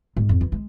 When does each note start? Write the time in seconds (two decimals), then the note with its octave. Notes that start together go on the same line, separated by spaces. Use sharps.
0.17 G#2
0.29 F2
0.41 E3
0.52 G#3